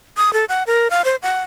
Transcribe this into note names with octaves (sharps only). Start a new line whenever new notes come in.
D#6
A4
F#5
A#4
F5
C5
F#5